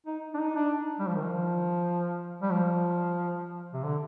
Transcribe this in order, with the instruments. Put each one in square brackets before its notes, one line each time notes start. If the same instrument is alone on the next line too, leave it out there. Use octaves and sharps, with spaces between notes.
[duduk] D#4
D4
D#4
D4
G3
F3
D#3
F3
G3
F3
C3
D3